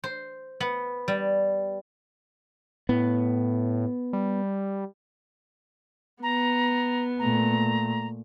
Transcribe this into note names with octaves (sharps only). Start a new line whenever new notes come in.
C5
B3
G3
A2 B3
G3
B3 A#5
A#2 A3 A#5